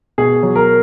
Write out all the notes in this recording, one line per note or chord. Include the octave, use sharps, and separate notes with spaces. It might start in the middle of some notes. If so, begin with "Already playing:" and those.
B2 G#4
F#3
A#4